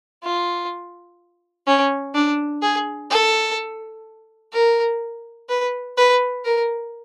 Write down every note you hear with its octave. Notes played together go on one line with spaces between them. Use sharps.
F4
C#4
D4
G#4
A4
A#4
B4
B4
A#4